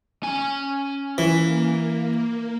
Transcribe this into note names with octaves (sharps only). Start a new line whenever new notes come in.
C#4 G#5
E3 A#3